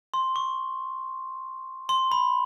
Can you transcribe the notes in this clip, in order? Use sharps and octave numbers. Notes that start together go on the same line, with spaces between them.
C6
C#6
C6
B5